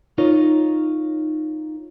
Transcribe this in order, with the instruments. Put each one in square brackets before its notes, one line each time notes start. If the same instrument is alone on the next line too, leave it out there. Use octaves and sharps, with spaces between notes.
[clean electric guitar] D#4 F4 A#4 C#5